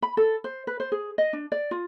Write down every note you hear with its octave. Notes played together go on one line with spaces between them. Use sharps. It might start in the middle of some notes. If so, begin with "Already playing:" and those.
B5
A4
C5
B4
C5
G#4
D#5
D4
D5
F4